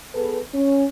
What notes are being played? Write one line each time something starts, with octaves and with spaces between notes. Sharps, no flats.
B3 G#4 A4 B4
C#4